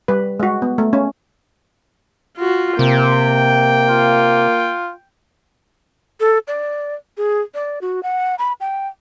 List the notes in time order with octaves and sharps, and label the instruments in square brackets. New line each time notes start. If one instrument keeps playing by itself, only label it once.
[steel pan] G3 B4
G#3 F#4
B3
A3
C#4
[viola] F4 F#4
[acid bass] C3 [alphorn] A#3 [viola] G5
[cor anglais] F4
[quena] A4
D5
G#4
D5
F#4
F#5
B5
G5